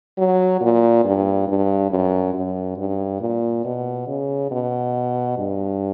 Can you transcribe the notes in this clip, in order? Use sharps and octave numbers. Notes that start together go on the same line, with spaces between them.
F#3
A#2
G2
G2
F#2
F#2
G2
A#2
B2
C#3
B2
G2